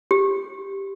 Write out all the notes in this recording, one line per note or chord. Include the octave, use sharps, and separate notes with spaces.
G4